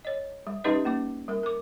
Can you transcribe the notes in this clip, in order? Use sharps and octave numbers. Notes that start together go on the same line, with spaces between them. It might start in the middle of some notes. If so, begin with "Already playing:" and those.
C#5 D#5
G3
G3 C#4 D#4 G4 B4 D#5
A#3 C#4 D6
G3 A#4
A#4 D6